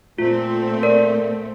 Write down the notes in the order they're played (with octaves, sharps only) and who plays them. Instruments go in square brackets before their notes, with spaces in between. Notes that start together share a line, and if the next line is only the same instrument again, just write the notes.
[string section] A#2 A3 C4 [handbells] F4
[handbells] A#4 D5